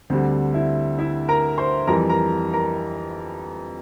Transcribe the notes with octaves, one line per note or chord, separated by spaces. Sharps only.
D2 D3 G3 C4 C5
E4 E5
E4 E5
A#4 A#5
C5 C6
F2 E3 G3 A#4 A#5
A#4 A#5
A#4 A#5